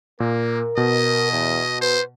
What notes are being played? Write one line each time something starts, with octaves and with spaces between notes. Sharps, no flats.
A#2 A#3 A#4
B2 D#5
E2
B4 C5